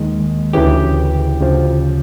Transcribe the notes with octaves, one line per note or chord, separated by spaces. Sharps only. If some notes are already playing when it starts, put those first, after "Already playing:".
Already playing: D#2 D#3 G#3
D2 C#3 E3 G4
D2 C#3 F3